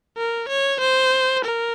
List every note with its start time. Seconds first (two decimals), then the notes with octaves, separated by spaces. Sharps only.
0.18 A#4
0.49 C#5
0.80 C5
1.44 A#4